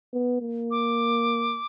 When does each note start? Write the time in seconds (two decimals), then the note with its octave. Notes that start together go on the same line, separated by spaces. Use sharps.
0.13 B3
0.42 A#3
0.71 D6